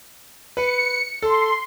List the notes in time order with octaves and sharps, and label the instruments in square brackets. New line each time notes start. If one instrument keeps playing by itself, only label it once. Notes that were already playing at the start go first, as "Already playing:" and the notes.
[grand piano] B4 [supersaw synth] C#7
[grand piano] A4 [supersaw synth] C6